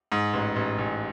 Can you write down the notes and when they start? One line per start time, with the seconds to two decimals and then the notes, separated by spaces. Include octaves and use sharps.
0.12 G#2
0.33 A1
0.56 A1
0.78 A1